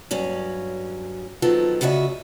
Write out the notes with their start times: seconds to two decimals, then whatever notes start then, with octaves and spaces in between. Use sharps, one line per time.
0.11 G2 F#3 C#4
1.42 D#3 F3 F#3 B3 A4
1.81 D2 C#3 F#4 D#5 E5